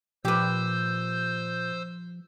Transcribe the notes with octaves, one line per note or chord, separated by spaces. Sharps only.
A#2 F3 G4 B4 C5 E6 G6